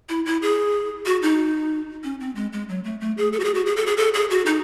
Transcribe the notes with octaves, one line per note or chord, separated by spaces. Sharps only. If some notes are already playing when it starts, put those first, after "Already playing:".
E4
E4
G#4
F#4
D#4
C#4
C4
G#3
G#3
F#3
A3
A3
G#4
A4
F#4
G#4
F#4
G#4
A4
G#4
A4
G#4
F#4
D#4